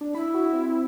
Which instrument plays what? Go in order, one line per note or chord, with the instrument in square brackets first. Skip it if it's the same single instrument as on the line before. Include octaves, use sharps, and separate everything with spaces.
[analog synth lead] D4
[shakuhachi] E4 [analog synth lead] B5
[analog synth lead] F#4
C4